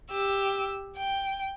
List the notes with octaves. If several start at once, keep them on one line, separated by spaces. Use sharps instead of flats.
G4 E6
G5